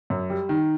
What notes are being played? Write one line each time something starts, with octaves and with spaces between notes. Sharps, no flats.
F#2
G3
D#3